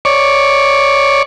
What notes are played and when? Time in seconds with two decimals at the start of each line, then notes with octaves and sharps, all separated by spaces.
0.05 C#5 D5